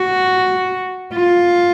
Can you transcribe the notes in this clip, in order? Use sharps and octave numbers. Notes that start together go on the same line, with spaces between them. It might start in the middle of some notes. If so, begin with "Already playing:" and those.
Already playing: F#4
F4